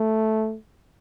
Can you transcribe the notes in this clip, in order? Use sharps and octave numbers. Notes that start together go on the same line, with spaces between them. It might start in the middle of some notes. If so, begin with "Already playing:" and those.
Already playing: A3